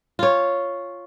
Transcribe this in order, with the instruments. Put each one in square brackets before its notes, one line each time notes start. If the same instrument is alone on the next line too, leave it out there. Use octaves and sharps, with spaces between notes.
[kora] F4 C#5